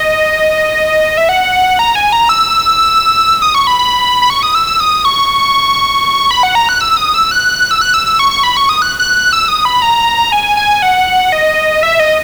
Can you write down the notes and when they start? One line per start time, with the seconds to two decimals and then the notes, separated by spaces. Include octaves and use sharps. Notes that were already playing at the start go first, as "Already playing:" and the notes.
Already playing: D#5
1.17 E5
1.29 F#5
1.79 A#5
1.95 G#5
2.12 A#5
2.29 E6
3.42 D#6
3.55 C#6
3.67 B5
3.79 B5
4.22 B5
4.30 C#6
4.43 D#6
4.55 E6
4.67 E6
4.80 D#6
5.05 C#6
6.31 B5
6.43 F#5
6.55 A#5
6.69 F#6
6.81 E6
6.97 D#6
7.14 E6
7.31 F#6
7.71 E6
7.81 F#6
7.94 E6
8.06 E6
8.19 C#6
8.31 C#6
8.43 B5
8.57 C#6
8.69 D#6
8.82 F#6
9.00 F#6
9.32 E6
9.48 D#6
9.65 B5
9.82 A#5
10.32 G#5
10.57 G#5
10.82 F#5
11.32 D#5
11.83 E5
12.00 D#5